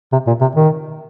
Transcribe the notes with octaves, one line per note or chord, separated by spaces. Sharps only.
C3
A#2
C3
D#3